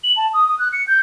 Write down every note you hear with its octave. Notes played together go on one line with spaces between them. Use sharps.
F#7
A5
D#6
D#6
F#6
C#7
G6